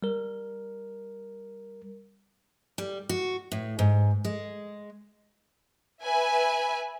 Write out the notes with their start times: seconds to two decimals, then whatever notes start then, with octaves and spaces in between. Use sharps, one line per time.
0.03 G3 A#4
2.78 G3
3.09 F#4
3.52 A2
3.79 G#2
4.25 G#3
6.03 B4 E5 G#5